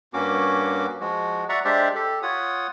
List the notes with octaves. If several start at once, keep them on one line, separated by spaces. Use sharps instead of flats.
G2 A#3 C#4 F#4 D6
F3 G#3 F#4
D5 E5 F#5 A#5 C#6
G#3 D4 G4 C5 D5 E5
G4 A4
F4 C#5 F#5 D#6